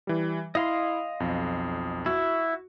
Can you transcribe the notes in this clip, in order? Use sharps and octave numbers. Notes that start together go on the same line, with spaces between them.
E3 G3
E4 D#5 F5 C6
B1 F2
E4 F#4